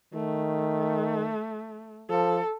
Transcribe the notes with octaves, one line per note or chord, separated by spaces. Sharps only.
D#3 A3
F3 A4